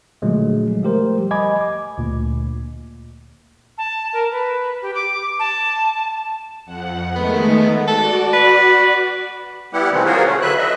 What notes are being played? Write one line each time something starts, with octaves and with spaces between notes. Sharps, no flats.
A#2 D3 F3 F#3 G#3 A3
F3 G3 A3 G4 A#4 C5
D#5 G#5 B5 D6 G#6
D6
D2 A#2
A5
A#4
B4
G4
D6
A5
F2 F#5
D#3 G#3 A3 B3
F#4 A4 D5
B4
G3 B3 E4 G4 F#5
C3 D#3 E3 G#3 A3 C4
F4 F#4 G#4 A#4 C5 C#5
A3 C#4
D3 F#3 B4 E5 F#6
D#5 E5